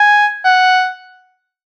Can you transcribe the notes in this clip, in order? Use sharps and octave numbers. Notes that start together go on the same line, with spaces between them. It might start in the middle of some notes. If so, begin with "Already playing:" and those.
Already playing: G#5
F#5